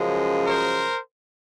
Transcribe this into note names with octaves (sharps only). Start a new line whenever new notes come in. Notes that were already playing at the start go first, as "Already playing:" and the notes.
Already playing: F#2 C#3 F3 G#3
A#4 C5